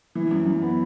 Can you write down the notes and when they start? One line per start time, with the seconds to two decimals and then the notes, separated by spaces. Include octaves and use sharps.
0.15 E3
0.31 F#2
0.46 F#2
0.62 B3